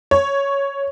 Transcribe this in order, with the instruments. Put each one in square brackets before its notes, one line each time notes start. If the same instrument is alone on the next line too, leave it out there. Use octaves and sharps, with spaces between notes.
[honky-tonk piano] C#5